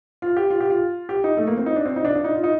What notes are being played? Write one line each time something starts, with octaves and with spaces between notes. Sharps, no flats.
F4
G4
F4
G4
F4
G4
D#4
A3
A#3
C4
D#4
D4
C4
D#4
D4
D4
D#4
F4
D#4